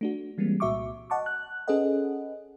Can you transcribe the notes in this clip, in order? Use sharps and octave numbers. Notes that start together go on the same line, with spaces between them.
A3 D4 F#4
E3 G3 G#3 A#3 C4
C2 A#2 F#4 E5 C#6 D6
D#5 F#5 A5 C#6 D6
F#6
C#4 G#4 A4 B4 D#5 F#5